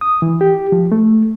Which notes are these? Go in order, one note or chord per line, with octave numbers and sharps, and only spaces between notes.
D#6
E3
G4
F3
A3